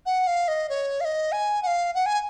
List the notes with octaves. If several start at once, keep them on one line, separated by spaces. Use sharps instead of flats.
F#5
F5
D#5
C#5
F5
D#5
G#5
F#5
F5
F#5
G#5